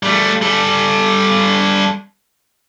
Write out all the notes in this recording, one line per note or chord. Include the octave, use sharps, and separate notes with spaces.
G3 A3
G3 A4